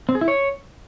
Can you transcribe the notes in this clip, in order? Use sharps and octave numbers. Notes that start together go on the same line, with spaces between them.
C4
G#4
E4
C#5